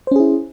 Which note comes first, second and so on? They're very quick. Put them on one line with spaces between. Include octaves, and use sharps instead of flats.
C5 C#4 G#4 E4